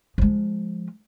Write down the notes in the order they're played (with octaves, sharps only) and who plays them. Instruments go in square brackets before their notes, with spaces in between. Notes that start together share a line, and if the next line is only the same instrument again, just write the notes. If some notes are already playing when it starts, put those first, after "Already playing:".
[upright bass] F3 G#3